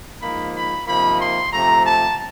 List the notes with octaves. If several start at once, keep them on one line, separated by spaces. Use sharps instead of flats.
G#2 F3 A#3 D#4 B5
B5
C3 F3 A#3 D#4 B5
C6
C3 F3 A3 A#5
A5